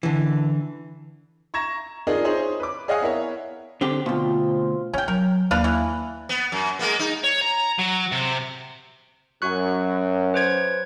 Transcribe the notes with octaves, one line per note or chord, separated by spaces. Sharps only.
D3 E3
A#5 C#6 G#6 A#6 E7
D4 D#4 F4 G#4 A#4 D#5
D#4 E4 G#4 C5 C#5
B4 D6
G#4 C#5 D#5 F5 F#5 G#5
B3 E4 A#4 C#5
D3 C4 G4
D2 B2 F3 C4 F4
C#3 C#4 G5
F#3 A#4
D#2 D4 B4 F5
E3
B3
F#2
G#3 A#3 B3
D#4
C#5
A#5
F#3
C3
F#2 F#4 C#6 F#6
B4 C5 G#6